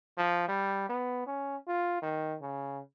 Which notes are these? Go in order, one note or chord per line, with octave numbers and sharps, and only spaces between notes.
F3
G3
B3
C#4
F4
D#3
C#3